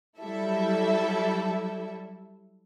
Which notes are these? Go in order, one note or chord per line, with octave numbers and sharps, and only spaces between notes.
F#3 G3 E4 A4 E5